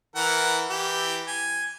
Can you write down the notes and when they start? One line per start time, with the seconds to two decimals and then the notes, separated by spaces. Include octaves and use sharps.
0.16 E3 A#4 F#5
0.69 E3 G4
1.27 G#5